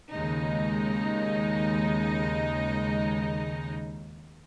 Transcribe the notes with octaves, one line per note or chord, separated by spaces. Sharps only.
D#2 C#3 G#3 D#4